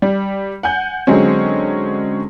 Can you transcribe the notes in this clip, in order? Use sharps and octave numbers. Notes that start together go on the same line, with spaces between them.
G3
F#5 G#5 G6
D3 F#3 G#3 C4 C#4